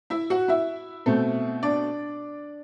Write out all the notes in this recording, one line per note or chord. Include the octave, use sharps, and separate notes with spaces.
E4 E5
F#4 F#5
E4 E5
B2 A3 C4
D4 D5